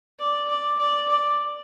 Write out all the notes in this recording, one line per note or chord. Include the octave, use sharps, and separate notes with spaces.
D5
D5
D5
D5